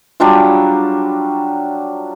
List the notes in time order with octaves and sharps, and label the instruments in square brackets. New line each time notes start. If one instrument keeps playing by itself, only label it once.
[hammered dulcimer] F#3 G3 D4 F4